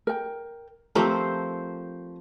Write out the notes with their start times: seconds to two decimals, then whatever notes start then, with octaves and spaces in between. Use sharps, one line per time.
0.07 A#4 G5
0.95 F3 A3 C4 G4 A#4 C5 A#5